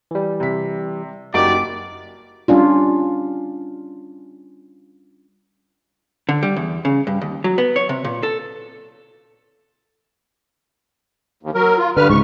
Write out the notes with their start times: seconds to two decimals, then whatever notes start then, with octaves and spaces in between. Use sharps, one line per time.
0.11 E3 G3
0.40 C3 B6
1.34 F#1 D#4 F#4 G4 D5 D6
2.48 G3 C#4 D4 F4
6.29 D3
6.43 G3
6.57 E2
6.85 C#3
7.07 G2
7.22 D#2
7.44 F#3
7.58 B3
7.76 C#5
7.89 C3
8.05 A#2
8.23 A4
11.43 D#2
11.55 F#3 A#4
11.78 F4
11.97 G2 D3 B4 F6
12.10 C#2 G#2 C#6